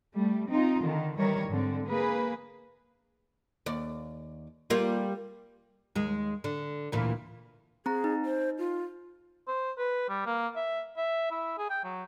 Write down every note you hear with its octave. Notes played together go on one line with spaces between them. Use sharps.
G3 A3
C4 D#4 F4
D3 D#3
D#3 E3 G3 A#4 C#5
G#2 D3 C4
A#3 G#4 B4
D#2 D5
G3 A#3 F4
D#2 G#3
D3
D2 A#2 E3
C4 G#4 A#5
D#4
C5
F4
C5
B4
G3
A#3
E5
E5
E4
G#4
G5
F#3